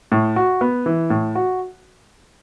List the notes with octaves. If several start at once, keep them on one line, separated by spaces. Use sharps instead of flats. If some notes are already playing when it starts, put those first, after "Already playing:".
A2
F#4
B3
E3
A2
F#4